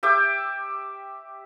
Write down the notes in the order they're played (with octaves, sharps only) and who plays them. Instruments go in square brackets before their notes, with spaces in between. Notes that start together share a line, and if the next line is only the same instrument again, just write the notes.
[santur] G4 E5 G5 D6